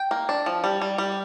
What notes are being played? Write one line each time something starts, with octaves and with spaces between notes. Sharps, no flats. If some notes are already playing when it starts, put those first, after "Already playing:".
Already playing: G5
A#3
D4
F3
G3
G3
G3